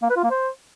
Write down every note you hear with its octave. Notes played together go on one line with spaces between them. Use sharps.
A#3
B4
F4
A#3
C5